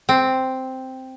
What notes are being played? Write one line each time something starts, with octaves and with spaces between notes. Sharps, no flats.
C4